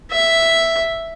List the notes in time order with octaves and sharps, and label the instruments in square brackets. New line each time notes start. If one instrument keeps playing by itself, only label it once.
[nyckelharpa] E5